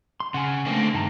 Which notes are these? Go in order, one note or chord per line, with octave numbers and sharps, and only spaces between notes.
C6
C#3 F#5 G#5
D3 A3 A#3 C4
G2 D#3 A5 A#5